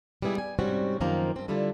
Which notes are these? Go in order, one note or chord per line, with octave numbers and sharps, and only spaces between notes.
G3 G#3 B3 E4 G#4
G#5
G#2 C3 G3 C4 C#4 F#4
F#2 D#3 F3 A#3 C4 A#5
G2 C4
D3 G3 E4 F4 A4